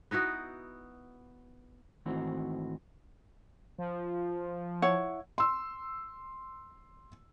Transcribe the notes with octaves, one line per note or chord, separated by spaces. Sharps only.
B3 D#4 E4 F#4
G#2 D#3 E3 A3 C4 F#4
F3
E4 C#5 F#5
C6 E6